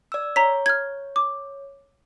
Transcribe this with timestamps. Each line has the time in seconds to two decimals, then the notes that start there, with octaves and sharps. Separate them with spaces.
0.12 D5 E6
0.36 C#5 A#5 B6
0.66 F6 G#6
1.16 D6